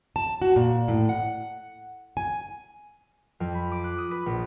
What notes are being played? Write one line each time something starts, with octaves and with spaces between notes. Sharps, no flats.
A5
F#4
A#2
A2
F#5
G#5
F2
B5
D6
F#6
D#6
B4
A#1